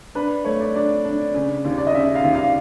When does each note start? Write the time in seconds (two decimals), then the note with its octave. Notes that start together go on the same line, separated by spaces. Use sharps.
0.15 D4 B4
0.45 A3 C#5
0.60 D5
0.75 D4 D5
1.05 D4
1.34 C#3
1.64 D#2
1.78 D5
1.87 D#5
1.94 C#3 E5
2.15 F5
2.24 D#2
2.35 F5